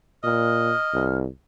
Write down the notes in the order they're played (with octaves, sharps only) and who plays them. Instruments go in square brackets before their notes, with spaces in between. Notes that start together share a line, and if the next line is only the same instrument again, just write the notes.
[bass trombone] A#2 [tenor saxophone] D#5 [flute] F6
[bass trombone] C2